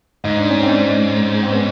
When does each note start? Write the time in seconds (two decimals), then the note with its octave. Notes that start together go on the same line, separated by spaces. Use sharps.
0.24 G#2 D#4
0.37 D4
0.50 C#4
0.63 C4 D4
1.43 C4
1.51 B3 C#4